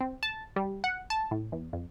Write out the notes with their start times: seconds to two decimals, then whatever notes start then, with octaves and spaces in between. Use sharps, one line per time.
0.01 C4
0.23 A5
0.56 G3
0.84 F#5
1.10 A5
1.31 A2
1.52 E2
1.73 F2